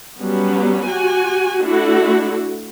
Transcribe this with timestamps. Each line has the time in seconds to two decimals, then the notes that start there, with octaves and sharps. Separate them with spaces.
0.19 F#3 G3 B3 C#4
0.88 F#4 G4 G#5
1.65 A3 D4 E4 F#4